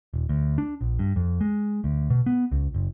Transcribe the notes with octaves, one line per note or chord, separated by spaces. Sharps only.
D#1
D2
D4
A#1
G2
F2
G#3
D2
B2
B3
C#2
F#1